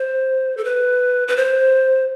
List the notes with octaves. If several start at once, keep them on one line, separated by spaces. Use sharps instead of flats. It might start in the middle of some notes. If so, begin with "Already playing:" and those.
Already playing: C5
A4
B4
B4
C5